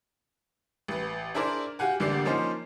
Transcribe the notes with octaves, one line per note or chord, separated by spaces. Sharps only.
A1 B4
D4 E4 G#4 A#4 C5 D5
F#4 G4 F5 F#5 G#5
A1 D3 A#3 G4 D5 C7
F3 A#3 C#4 D#4 C5